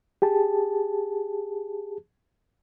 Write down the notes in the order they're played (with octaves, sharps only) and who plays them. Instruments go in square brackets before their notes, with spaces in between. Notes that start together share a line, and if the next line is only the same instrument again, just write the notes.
[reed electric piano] G4 G#4 A5